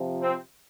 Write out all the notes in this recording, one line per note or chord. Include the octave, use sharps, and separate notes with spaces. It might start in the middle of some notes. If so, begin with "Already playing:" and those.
Already playing: C3 F3
C4